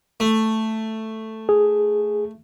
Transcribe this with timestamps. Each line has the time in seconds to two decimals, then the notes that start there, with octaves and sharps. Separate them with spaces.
0.20 A3
1.49 G#4